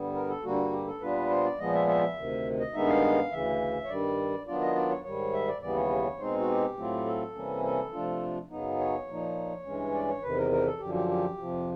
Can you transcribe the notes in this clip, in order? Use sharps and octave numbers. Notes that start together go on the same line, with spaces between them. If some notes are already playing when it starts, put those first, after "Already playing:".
Already playing: G2 D3 G3 B3
A#4
A4
G2 D3 G3 A#3 F#4
G4
A4
A#2 G3 B3 D4 F4 B4
C5
D5
A#2 F3 G#3 B3 D#5
E5
E5
D2 C3 D#3
D#5
G2 D#3 G#3 B3 D#4 E5
F5
D2 C#3 E3 E5
C#5
G2 D#3 G3 D5
D#3 F#3 B3 D4 F4 D5
D#5
D5
C#5
G#2 D#3 G3 C#5
E5
D5
D#2 C#3 E3 G3 B3 D5
C#5
B2 G#3 C4 D#4 C5
F#4
G4
A2 F#3 A3 C4 F4
A4
C3 E3 G3 A#3 C#4
A4
C3 F3 A3 D4 F4
F#2 C#3 F#3 B3 D#4
C#5
A#2 F3 A#3 D#4
G2 E3 G#3 C#4
D5
C#5
E2 C3 D#3 B4
A#4
A#4
A4
F#2 D3 F3 G4
G4
G4
F2 C3 F3